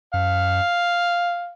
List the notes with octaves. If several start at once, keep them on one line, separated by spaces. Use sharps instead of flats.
F#2 F5